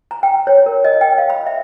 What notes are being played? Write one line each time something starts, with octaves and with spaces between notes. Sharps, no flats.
A#5
G5
C#5
A#4
D#5
G5
F5
B5
E5